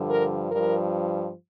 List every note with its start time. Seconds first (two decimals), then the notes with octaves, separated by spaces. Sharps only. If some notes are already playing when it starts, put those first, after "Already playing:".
Already playing: G2 D3 F3
0.10 A#4
0.51 G2 F3 A#4